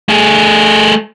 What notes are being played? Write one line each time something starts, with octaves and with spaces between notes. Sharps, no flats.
A3 G#4